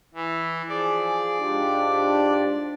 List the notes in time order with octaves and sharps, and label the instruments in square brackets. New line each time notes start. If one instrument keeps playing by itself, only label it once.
[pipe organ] E3
[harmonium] F3 G#4 [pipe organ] D5
[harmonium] G#2 F4 G4 [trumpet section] D4